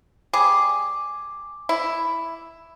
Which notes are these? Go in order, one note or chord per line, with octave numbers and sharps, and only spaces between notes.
G3 G#4 D6
E4